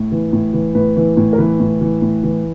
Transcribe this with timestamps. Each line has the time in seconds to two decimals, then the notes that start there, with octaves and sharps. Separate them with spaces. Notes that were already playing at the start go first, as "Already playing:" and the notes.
Already playing: A2
0.12 E3
0.33 A2
0.54 E3
0.75 A2 B4
0.97 E3
1.17 A2
1.33 A#4
1.38 E3 B4
1.60 A2
1.81 E3
2.02 A2
2.24 E3